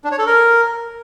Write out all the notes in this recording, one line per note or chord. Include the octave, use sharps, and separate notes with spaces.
D4
C#5
A4
A#4